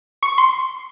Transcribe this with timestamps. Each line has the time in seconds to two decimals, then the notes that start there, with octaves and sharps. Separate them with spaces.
0.23 C#6
0.38 C6